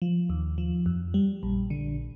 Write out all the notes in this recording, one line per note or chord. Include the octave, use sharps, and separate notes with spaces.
F3
D#2
F3
F2
G3
A#1
D3